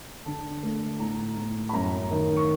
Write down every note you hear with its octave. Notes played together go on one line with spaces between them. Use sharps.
D3 A5
A3
A2 A#5
A2
B5
F#2 A#5
D#3
C#6